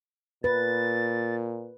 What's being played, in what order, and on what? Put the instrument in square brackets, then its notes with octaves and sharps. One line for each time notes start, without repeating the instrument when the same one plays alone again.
[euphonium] A#2 [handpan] B4 [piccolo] A6